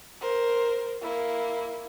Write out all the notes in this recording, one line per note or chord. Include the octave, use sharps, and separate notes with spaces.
A#4 C5
A#3 E4